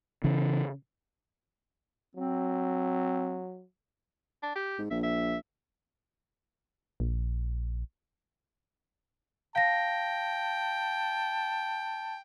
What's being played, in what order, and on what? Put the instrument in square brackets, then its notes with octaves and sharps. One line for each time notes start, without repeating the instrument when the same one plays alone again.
[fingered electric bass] C#3 E3
[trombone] F#3 [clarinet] C4
[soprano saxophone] D4
G4
[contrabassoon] G#2
[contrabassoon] A#1 [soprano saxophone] E5
[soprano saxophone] E5
[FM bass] A#1
[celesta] F5 A#6 [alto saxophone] G5 [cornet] A5